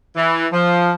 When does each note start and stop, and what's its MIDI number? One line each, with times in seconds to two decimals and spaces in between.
0.16 0.47 52
0.53 0.92 53